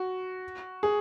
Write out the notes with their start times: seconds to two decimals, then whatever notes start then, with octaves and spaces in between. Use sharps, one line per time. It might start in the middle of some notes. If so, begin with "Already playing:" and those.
Already playing: F#4
0.83 G#4